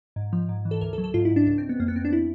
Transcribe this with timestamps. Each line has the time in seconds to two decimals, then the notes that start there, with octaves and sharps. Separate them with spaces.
0.16 G#2
0.33 F3
0.49 G#2
0.65 E3
0.71 A4
0.81 D2 A#4
0.93 A4
0.98 F#3
1.04 A4
1.14 G#2 F4
1.25 E4
1.31 G#2
1.36 D4
1.47 C#2 D4
1.58 C#2 C4
1.69 B3
1.80 F2 A#3
1.88 B3
1.96 F2 C4
2.05 D4
2.13 E4